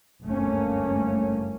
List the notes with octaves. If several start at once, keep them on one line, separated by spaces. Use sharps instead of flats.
F#1 D2 G2 A3 A#3 C#4